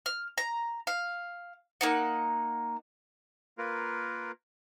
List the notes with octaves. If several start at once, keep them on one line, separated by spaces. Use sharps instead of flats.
F6
A#5
F5
A#3 D#4 F#5
A#3 F4 A#4 B4